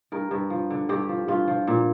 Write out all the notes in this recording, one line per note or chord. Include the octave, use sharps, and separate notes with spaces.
G2 A#4
G2
F3
D3
G2 G4
F3
G2 F4
F3
A#2